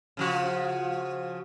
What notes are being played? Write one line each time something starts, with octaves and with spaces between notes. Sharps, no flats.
C#3 F3 F#4